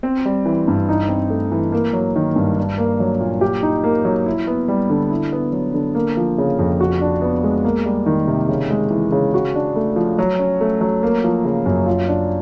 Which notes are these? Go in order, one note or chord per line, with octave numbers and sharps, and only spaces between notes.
C4
G3
E3
G2
D#4
C4
A3
E3
A#3
F#3
D#3
G2
D4
A#3
F#3
A#2
G4
D#4
A#3
F#3
E4
B3
G3
D3
E4
B3
F#3
D3
A#3
F3
C#3
F2
F#4
D4
B3
G#3
A#3
G3
D#3
C3
C#3
G#3
E3
C#3
F#4
D4
A3
F3
F#3
C#4
A3
F#3
A#3
F3
C#3
F#2
F4
D4